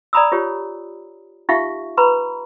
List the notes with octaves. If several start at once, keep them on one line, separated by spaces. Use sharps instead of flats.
D5 G#5 A#5 B5 D#6 E6
F4 G4 C#5
D#4 F4 G4 E5 F5 C#6
B4 A#5 B5 C#6